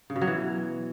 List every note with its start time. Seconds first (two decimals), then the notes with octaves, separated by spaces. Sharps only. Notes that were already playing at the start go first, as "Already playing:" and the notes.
0.10 C#3
0.16 B2
0.21 F#3
0.27 E3